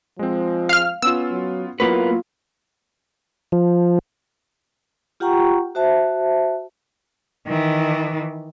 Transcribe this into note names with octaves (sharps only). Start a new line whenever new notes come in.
F3 G#3 C4
F5 F6
B3 C#4 F4 E6
F#3
F#3 A#3 B3 E4 F4 B4
F3
F4 G4 F#5 G5 A#5 C#6
F#4 C5 E5 A5
D#3 E3